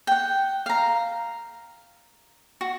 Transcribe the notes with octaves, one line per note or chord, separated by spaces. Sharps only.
F#5 G5
F5 A#5
F#4